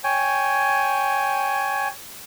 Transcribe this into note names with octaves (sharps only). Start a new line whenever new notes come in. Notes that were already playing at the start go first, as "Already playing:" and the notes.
C#5 G5 G#5